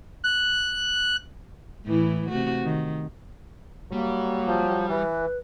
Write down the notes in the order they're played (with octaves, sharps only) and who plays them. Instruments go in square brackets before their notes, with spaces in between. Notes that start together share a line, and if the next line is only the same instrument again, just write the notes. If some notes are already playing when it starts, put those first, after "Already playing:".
[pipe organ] F#6
[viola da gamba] A2 E3 E4
C3 A3 F#4
D#3
[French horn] F#3 [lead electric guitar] G3 [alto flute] A#3
[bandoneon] F3
[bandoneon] E3 [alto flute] B4